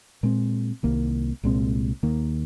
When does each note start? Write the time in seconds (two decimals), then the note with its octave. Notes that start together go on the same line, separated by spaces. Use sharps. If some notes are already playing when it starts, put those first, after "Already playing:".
0.23 A#2 G#3 C4
0.83 C2 C3 D#3 A#3
1.44 C2 A#2 G#3 C4
2.03 D#2 D#3 A#3